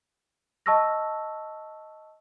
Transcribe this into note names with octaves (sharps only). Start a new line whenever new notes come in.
D#5 A5 C#6 E6 F6 A#6